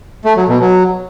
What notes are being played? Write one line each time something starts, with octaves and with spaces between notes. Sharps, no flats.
A3
F#3
B2
F#3